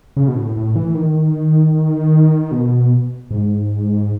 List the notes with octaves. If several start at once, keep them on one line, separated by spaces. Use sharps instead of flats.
C#3
B2
A2
A2
E3
D#3
B2
G#2